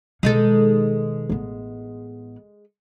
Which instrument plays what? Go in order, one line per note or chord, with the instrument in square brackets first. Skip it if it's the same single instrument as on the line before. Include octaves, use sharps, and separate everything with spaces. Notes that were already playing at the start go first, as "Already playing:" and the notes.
[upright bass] B2 D#3 [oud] G#3 D#4 A4
[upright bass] A1 B3